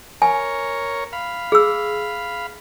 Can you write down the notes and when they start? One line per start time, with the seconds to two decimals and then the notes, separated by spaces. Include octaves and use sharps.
0.22 A#4 C#5 G#5
1.13 F5 B5
1.52 G#4 E6